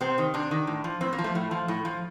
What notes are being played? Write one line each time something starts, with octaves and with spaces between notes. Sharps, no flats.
C3 C4
D#3
C3 D4
D#3
A2
F3
A2 C4
A#3
F3
A3
A2
F3
A2
F3